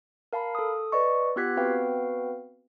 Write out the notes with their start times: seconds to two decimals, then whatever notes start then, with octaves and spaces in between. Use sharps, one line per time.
0.33 A#4 F5 A5 B5
0.55 A4 D#6
0.92 B4 D5 D#5 C#6
1.36 B3 F4 G4 F#6 G#6 B6
1.57 B3 C4 F#4 B4 F5 G5